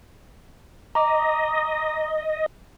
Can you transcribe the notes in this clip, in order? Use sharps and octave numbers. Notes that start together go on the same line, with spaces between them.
D#5 A#5 D6